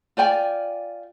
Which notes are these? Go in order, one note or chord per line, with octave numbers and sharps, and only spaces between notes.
F4 D5 G5 G#5